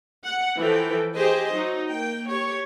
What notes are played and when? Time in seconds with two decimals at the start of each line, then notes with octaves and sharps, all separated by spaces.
0.25 F#5
0.58 E3 F3 A4 G5
1.15 G4 G#4 C5 D#5
1.55 F#3 D#4
1.90 A#3 G5
2.29 G4 C#5